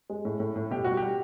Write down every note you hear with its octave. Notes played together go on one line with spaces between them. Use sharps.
G#3
A2
A2
A2
B2 G4
G3 F#4
G4
G3